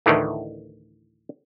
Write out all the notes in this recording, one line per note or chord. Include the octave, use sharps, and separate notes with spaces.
D2 A2 D#3 E3 A3